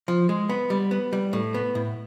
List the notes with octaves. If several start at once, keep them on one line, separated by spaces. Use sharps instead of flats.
F3
G#3
B3
G3
B3
G3
A2
B3
A2